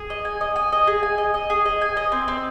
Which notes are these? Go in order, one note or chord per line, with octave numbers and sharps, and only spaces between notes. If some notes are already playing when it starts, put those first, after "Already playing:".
Already playing: G#4
D#5
G#5
D#5
G#5
D#5
G#4
G#5
D#5
D#5
G#4
D#5
G#5
D#5
C4
C4